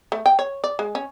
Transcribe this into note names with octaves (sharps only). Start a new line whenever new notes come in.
A3
G5
C#5
D5
G#3
C#4